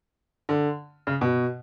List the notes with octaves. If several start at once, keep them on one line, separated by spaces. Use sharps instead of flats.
D3
C#3
B2